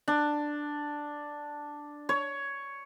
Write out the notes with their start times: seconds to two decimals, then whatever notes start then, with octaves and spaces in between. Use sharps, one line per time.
0.08 D4
2.09 C#5